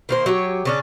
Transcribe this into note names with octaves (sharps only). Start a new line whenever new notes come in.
D#3 A#3 C5
F#3 G4 C#5
C#3 C#4 D4